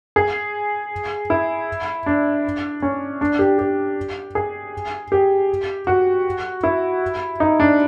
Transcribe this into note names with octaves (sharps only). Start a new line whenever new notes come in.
G#4
E4
D4
C#4
D4
G4
G4
G#4
G4
F#4
E4
D#4
D4